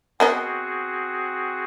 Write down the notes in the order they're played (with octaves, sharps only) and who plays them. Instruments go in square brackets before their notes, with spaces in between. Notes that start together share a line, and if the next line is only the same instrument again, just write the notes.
[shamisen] B3 A#4 D#5 [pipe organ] C4 F#4 G#4